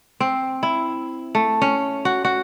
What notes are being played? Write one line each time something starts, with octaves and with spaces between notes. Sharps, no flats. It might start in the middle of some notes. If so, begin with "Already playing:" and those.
C4
E4
A3
C#4
F#4
F#4